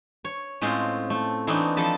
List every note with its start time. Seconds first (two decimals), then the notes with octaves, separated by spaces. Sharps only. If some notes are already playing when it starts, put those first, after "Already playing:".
0.25 C#5
0.61 A2 G#3 C4 C#4 F4
1.10 A3
1.47 E3 A3 B3 C4 D4 D#4
1.77 F3 A4 B4 A5 B5